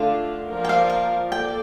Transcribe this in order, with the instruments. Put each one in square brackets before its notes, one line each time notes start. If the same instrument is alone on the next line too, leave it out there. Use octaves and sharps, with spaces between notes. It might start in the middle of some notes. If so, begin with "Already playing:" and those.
Already playing: [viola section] D3 A3 D4 F4 [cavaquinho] F5
[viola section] F3 A#3 F4 A#4 D5
[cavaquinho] G5
F5
F5
[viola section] A#3 A4 D5 [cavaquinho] G5